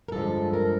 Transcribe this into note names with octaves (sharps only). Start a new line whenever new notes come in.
A#4
G2 D3 F3 G#3 A4
A#4